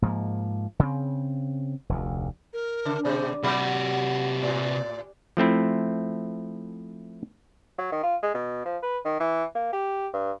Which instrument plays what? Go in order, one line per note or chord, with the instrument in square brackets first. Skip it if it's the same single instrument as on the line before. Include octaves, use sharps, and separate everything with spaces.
[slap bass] G#2 F3 A#3
C#3 C4
F1 D2
[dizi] A#4
[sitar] C#3
[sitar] B2 G#3 D5 [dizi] C5
[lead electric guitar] C3 F#4 [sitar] F#3 G3 [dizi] F#5
[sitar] A2 [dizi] D5
[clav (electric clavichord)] F3 A3 C4 E4
[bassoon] F#3
D#3
F4
G#3
B2
F3
B4
D#3
E3
A#3
G4
G2